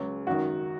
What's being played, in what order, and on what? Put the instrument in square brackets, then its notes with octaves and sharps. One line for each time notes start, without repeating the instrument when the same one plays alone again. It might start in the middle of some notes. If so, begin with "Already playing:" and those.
Already playing: [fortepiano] C#2 C#3 F#3
[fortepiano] G#1 F#2 D#3 [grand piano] F#4